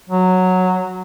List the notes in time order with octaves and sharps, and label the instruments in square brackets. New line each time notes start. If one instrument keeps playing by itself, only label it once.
[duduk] F#3